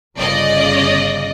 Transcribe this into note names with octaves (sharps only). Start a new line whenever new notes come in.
G1 C#3 D5 D#5